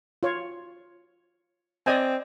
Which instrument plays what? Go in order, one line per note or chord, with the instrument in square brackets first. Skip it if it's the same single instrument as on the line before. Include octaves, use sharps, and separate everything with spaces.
[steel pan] F4 C#5
[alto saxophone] C4 [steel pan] D5 D#5 G#5